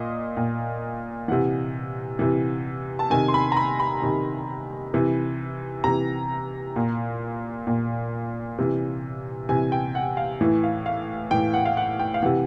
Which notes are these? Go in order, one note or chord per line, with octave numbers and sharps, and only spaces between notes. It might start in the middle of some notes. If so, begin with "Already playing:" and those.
Already playing: A#2 D#5
A#2
C3 E3 F#5
C3 E3
A5
C3 D#3 G#5
C6
B5
A#5
B5
B5
C3 D#3
C3 E3
C3 E3 A#5
A#2
A#2
C3 E3
C3 E3 G#5
G5
F#5
F5
A2 E3
F5
F5
A2 E3 G5
F#5
F5
F#5
G5
F5
C3 E3 F#5